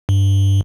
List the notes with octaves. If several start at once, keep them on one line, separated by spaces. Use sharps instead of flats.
G2